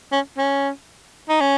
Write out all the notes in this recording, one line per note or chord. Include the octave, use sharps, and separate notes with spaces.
C#4
C#4
D#4
C#4